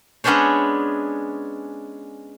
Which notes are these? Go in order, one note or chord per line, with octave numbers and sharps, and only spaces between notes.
G#3 B3 C#4 D4 C5 C#5